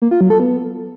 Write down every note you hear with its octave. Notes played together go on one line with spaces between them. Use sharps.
A#3
F4
F#3
A4
B3